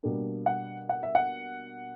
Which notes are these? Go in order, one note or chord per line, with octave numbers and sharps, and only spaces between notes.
B2 G3 A#3 D4
F#5
F#5
E5
F#5